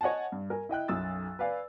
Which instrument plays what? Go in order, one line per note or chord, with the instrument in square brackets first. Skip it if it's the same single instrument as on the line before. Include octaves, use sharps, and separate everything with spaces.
[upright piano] C#5 D#5 F#5 G#5 A5
G2
A#4 G#5
E4 D#5 G5 F#6
B1 F#2 D#6 E6 A6
B4 D5 F5 G#5